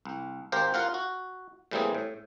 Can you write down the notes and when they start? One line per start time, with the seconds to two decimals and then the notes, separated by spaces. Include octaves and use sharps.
0.05 C2
0.52 G#1 G4 A#4 C5 F5
0.74 F4 A#4 F5 F#5
0.94 F#4
1.71 A2 E3 G3 A#3 C4 G#4
1.95 A2